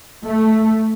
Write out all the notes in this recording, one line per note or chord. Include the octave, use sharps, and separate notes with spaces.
A3